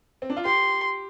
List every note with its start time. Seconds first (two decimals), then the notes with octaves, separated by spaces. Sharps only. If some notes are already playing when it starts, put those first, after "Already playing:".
0.22 C4
0.30 D4
0.37 F4
0.45 G4 C6